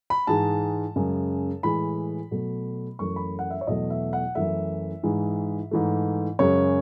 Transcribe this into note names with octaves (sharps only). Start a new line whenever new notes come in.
B5
G#2 E3 G#3 A5
F#2 C#3 G#3
A2 E3 G#3 B5
B2 F#3 A3
F#2 E3 A3 C#6
B5
F#5
E5
C#5
E2 B2 F#3 A3 D#5
E5
F#5
F#2 E3 A3 E5
G#2 E3 G#3
G#2 E3 A3
F#2 C#3 G#3 C#5